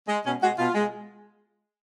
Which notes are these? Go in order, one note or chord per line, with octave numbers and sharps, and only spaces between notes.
G#3
B2 C#4
G#3 F#4
B2 F4
G#3